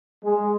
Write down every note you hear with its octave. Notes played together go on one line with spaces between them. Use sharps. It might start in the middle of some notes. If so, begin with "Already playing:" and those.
G#3